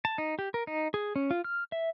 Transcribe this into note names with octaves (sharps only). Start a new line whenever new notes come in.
A5
D#4
G4
A#4
D#4
G#4
C#4
F4
F6
E5